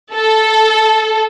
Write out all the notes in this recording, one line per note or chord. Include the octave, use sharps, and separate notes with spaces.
A4